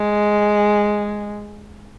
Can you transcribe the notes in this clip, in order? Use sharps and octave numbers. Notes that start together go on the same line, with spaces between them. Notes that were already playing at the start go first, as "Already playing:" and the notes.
Already playing: G#3